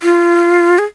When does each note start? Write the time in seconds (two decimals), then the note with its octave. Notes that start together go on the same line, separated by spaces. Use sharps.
0.03 F4
0.79 G#4